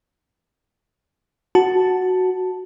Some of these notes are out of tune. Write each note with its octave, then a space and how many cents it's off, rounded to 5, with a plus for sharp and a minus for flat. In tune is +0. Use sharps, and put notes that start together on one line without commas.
F#4 +0 A5 +0